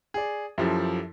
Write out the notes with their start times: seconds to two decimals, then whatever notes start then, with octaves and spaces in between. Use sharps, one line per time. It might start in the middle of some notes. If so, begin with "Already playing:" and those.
0.14 G#4 D5
0.58 F#2 F3 E4 G4 A4